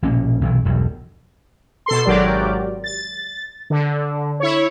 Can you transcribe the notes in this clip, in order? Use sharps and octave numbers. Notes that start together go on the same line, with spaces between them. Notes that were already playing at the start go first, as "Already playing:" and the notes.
A#1 B2 A#3 C#4
B1 C3 E3
E1 B1 G2
B2 A4 C6
G#1 F#3 G4 A#4 D5
A6
D3
E4 C#5